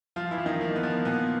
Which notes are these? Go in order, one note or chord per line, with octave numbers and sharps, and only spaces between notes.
F3 F4
E3 E4
F3
D#3 D#4
F3 A#3
B3
F3
A#3
A#2 B3